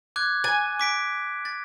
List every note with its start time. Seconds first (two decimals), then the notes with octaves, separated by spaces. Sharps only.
0.16 D6 F#6 G#6
0.44 G#5 A6
0.79 D6 B6 D7
1.45 A6